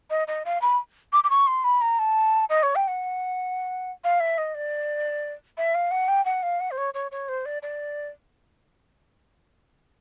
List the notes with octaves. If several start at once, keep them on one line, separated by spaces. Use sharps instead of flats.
D#5
D#5
F5
B5
D6
D6
C#6
C6
B5
A#5
A5
D#5
C#5
G5
F#5
F5
E5
D#5
D5
E5
F5
F#5
G5
F#5
F5
F#5
C5
C#5
C#5
C#5
C5
D5
D5